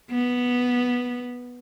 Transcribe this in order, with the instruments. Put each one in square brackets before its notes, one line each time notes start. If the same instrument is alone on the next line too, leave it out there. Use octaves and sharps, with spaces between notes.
[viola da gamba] B3